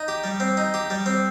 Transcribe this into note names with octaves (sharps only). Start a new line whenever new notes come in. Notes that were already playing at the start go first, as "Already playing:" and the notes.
Already playing: D#4
G4
G3
C4
D#4
G4
G3
C4